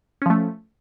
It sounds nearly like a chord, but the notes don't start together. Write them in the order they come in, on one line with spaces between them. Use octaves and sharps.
C#4 F3 A3